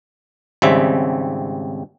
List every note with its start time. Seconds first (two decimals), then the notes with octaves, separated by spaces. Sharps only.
0.62 G#1 C#3 G3 C4 E5